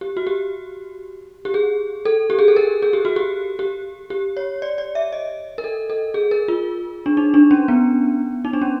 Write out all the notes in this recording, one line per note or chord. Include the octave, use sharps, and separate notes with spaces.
G4
F#4
G4
G4
G#4
A4
G4
G#4
A4
A#4
G#4
G4
F#4
G4
G4
G4
C#5
D5
D5
E5
D#5
A#4
A4
A4
G#4
A#4
F4
D4
D#4
D4
C#4
B3
D#4
D4
C#4